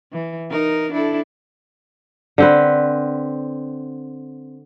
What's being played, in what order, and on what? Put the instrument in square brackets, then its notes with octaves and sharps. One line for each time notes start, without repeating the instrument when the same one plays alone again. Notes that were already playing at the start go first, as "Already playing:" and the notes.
[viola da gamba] E3
D#4 A#4
D4 E4 A4
[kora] D3 C4 B4